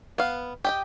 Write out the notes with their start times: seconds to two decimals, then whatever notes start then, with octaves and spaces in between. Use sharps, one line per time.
0.18 B3 F5
0.64 G4 D#5 G5